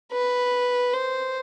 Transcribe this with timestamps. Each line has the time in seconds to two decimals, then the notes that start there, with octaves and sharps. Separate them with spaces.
0.12 B4
0.93 C5